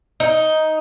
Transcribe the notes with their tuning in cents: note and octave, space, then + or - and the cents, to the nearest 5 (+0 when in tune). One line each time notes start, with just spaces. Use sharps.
D#4 +10